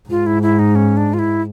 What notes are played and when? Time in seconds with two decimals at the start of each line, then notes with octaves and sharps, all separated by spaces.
0.10 G#2 F4
0.26 E4
0.43 E4
0.59 D#4
0.75 C#4
0.97 D4
1.14 F4
1.19 E4